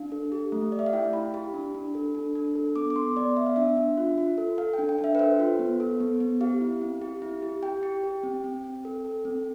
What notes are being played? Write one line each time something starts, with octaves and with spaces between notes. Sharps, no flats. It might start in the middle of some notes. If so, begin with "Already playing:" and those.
Already playing: D4 F5
A4
G4
A3
G4 D5
E5
F5
E4 G5
E4 B5
G4 B5
D4
D4
A4
D4
D4
A4
B3 D6
D6
B3 C6
B3 D5
B3 E5
F5
D4 E5
D4
F4
F4
A4
A4 F5
G5
D4
G5
D4
E5
B4
A4 C5
F4
B3
A4
B3
B3
G4 F5
E4
C4
G4
E4
G4
G4 G5
G4
G4
C4
C4
C4
A4
A4
C4